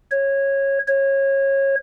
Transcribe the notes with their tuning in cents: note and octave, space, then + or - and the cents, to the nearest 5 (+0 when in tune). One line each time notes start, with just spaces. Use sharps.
C#5 -15
C#5 -25